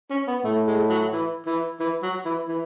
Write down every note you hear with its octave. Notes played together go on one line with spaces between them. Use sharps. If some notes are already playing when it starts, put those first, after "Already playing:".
C#4
B3
A2 A3
G#3
F#3
E3
E3
E3
F#3
E3
E3